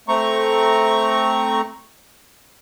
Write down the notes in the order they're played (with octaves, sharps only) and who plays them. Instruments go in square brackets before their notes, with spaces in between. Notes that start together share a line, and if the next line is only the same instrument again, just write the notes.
[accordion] A3 C4 A#5 C#6